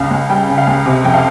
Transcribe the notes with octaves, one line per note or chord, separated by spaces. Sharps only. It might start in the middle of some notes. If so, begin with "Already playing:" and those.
Already playing: C#2 C#3 F5
C#2
G3 G5
C#3
F5
C#2
C3
F2 G5
F5